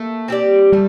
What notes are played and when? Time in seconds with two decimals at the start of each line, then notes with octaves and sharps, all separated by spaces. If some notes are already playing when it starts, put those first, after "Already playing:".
Already playing: A3 A#3
0.28 C4 G4 D5
0.72 G3 A3